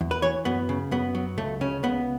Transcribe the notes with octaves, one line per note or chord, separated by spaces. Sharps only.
E2
B4
E3 C#5
F#2 B3
C#3
F#2 B3
F#3
C#2 A3
C#3 C#4
C#2 B3